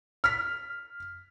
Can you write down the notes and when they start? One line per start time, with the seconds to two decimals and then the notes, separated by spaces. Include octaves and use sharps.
0.24 F6 B6